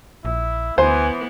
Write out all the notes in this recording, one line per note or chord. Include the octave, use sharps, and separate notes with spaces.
A#1 E4
D2 E3 B3 C5 G#5